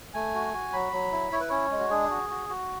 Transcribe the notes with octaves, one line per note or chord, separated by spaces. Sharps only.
A3 G#5
F#4
F#4
F#3 B5
F#3
E4
E4 C#5
B4
C#4 C#5
G#3
F#4
D4 G#4
F#4
F#4
F#4